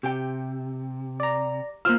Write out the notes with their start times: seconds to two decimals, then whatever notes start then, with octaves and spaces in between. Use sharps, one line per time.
0.03 C3 G4 G5
1.20 D5 A#5
1.85 A#3 F4 C5 E6 F6